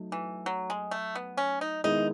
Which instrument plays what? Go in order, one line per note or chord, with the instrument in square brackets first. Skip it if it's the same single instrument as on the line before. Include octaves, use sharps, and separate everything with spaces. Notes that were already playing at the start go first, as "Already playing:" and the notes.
Already playing: [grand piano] F#3 A3 D#4
[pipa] E3
F#3
G#3
A3
B3
C#4
D#4
[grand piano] D#3 G#3 B3 E4 G#4 [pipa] D#4